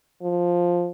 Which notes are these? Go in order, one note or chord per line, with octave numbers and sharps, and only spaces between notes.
F3